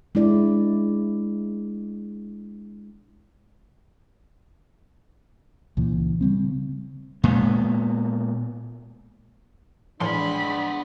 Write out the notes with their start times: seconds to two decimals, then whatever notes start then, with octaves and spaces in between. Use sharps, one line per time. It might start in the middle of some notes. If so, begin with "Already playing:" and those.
0.15 G#3 D4 E4 D5
5.77 C#2 A#2 E3
6.21 C#3 G3 C4
7.24 A#2 G#3 B3
10.00 A2 E3 F3 G#3 B3 D4 B5 C6